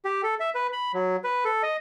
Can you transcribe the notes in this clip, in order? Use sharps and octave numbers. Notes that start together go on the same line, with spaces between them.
G4
A4
E5
B4
B5
F#3
B4
A4
D#5